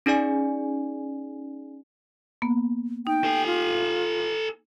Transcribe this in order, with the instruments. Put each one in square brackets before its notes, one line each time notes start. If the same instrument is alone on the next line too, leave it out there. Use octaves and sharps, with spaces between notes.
[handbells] C#4 D#4 G#4 D5 G#5
[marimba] A#3 B3
[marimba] D#4 [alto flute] G5
[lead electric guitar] A4 G#5
[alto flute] F4